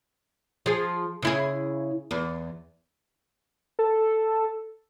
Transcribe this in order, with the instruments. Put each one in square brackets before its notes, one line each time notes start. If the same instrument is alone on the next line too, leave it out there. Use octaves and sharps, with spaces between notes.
[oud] F3 G#4
C#3 E4 G#4
E2
[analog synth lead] A4